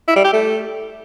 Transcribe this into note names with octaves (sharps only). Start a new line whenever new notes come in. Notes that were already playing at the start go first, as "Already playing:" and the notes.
E4
G3
G4
A3